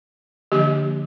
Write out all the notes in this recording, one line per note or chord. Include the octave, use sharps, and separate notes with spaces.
D3 F3 A#3 D4 G4